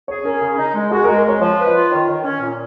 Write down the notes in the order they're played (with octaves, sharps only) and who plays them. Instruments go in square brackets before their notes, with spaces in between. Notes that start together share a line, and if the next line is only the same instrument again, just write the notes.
[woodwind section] G#4 [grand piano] C#5
[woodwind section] C#4 [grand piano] A#4
[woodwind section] C#3
D#4
G#3
[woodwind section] F#4 [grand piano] G#4
[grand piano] A#4
[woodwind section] G#3
[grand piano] A#4
[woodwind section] G#3 [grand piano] C#5
[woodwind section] F3 [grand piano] C#5
[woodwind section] B4
[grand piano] D#5
[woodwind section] F4
[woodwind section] D#3 [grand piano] C#5
[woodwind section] D#3
C#4
A#2